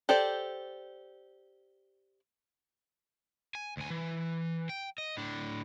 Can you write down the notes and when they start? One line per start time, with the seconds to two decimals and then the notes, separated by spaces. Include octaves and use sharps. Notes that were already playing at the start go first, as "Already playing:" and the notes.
0.09 G4 A4 C5 D5
3.55 G#5
3.77 D2 G#5
3.90 E3
4.69 G5
4.98 D#5
5.17 A2 D4